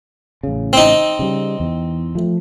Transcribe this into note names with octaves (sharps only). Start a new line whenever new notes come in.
A1 C#3
C4 D#4
C#3 G3
E2
F3 A3